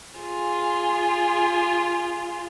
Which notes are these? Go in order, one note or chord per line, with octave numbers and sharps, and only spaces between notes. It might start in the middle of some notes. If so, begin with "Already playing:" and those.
F4 G#4